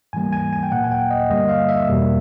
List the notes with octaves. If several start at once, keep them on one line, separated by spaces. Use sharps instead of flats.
G#2 E3 G3 A#3 G#5
G#5
G#5
G5
A#2 F#3 A#3 F#5
G#5
G5
D#5
G2 D3 G3 A#3 D#5
F5
E5
E2 B2 G3 A#3